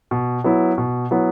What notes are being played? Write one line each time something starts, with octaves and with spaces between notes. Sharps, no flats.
B2
F#3 B3 E4
B2
F#3 B3 E4